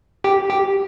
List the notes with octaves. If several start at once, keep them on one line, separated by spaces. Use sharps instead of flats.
G4
G4